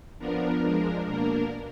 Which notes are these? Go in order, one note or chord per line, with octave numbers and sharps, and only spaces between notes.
F3 B3 D4 A#4
F3 G#3 D4
B2 A#3 D4 A#4